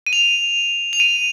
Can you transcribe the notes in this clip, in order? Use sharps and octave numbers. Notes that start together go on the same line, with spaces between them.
D#7
F7
F7
D#7